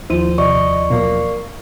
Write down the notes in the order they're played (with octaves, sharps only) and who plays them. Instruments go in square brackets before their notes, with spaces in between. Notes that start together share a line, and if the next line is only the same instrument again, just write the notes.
[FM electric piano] D#2 F3 [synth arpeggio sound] E4 D#7 [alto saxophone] C5
[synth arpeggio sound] C3 [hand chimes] D5 C#6 [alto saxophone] D#5
[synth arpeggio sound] B2 F#3 [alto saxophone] A#3